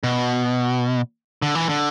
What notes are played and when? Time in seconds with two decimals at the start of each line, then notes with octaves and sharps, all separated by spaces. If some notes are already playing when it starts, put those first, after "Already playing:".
0.04 B2
1.42 D3
1.55 E3
1.69 D3